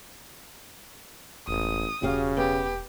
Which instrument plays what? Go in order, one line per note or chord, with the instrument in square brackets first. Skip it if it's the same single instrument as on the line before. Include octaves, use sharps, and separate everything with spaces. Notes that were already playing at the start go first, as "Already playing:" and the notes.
[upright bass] E1 [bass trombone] A1 [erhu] D#6
[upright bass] E1 [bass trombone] C#3 [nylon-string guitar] F#4 G4 F5
[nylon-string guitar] B3 [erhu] G4